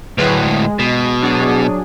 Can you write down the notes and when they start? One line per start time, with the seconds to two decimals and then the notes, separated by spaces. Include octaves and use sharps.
0.18 D2 A2 F#3 G#4 B4
0.43 G#3
0.79 B2
1.21 F#3 D4 G#4